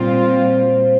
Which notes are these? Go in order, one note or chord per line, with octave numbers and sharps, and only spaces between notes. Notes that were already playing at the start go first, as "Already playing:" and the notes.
Already playing: A#2 G3 C4 F4 C5